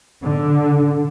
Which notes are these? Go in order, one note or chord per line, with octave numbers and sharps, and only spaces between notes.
D3